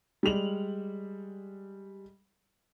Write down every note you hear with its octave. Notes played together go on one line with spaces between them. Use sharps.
G3 G#3 F7 F#7